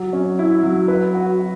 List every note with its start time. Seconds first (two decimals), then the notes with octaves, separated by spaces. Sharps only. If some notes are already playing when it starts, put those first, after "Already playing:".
Already playing: F#3
0.13 C#4
0.39 E4
0.63 F#3
0.88 B4
1.14 F#4
1.39 F#4